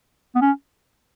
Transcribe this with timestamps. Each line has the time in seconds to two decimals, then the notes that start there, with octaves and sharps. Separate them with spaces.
0.36 B3
0.42 C#4